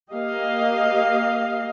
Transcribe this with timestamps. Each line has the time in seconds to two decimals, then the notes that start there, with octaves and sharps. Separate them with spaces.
0.13 A#3 G4 D#5 F5